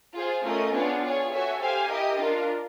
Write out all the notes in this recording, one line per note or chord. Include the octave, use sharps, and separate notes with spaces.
F4 G#4 C5
A3 C#4 F4 A#4 D#5
B3 D4 F4 G#4 C#5
F4 G#4 C#5
F#4 A4 C#5 E5 G#5
G4 C5 F5 G#5
E4 G4 A#4 D#5
D4 F4 A#4